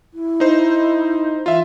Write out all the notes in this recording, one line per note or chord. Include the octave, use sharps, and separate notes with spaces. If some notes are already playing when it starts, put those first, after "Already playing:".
E4
D#4 C5
E3 F4 E5